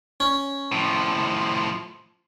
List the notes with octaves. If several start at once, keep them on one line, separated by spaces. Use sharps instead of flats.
C#4
A2 F3